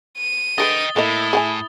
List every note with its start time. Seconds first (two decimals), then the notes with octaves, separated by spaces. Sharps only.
0.18 D#7
0.58 D3 G#3 B4 D#5 G5 D#6 A6 G7
0.96 A2 A#3 E4 A4 D#5
1.33 G#4 F#5 G#5